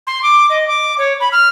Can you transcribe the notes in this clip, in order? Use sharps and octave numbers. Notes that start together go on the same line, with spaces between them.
C6
D6
D#5
D6
C#5
B5
F6